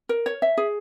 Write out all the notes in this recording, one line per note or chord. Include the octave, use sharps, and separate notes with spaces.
A#4
C#5
E5
G#4